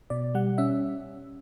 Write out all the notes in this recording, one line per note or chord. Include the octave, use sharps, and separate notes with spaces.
B2 D5
G3 F#5
C#4 E5